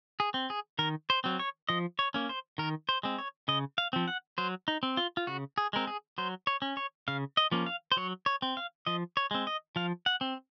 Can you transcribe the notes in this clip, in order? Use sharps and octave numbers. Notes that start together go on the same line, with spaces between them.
G#4
C4
G#4
D#3 A#4
C5
F#3 C4
C#5
F3 D#5
C#5
A#3 C#4
C5
D#3 A#4
C5
G#3 C4
C#5
C#3 D#5
F5
F3 C4
F#5
F#3 C5
D#4
C4
F4
F4
C#3 F#4
G#4
G#3 C4 A#4
G#4
F#3 C5
C#5
C#4
C#5
C#3 F5
D#5
F3 A#3 C#4
F5
C5
F#3 C#5
C#5
C4
F5
F3 D#5
C#5
G#3 C4
D#5
F3 F5
F#5
C4